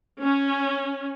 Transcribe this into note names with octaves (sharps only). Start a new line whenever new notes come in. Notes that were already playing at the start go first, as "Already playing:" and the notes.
C#4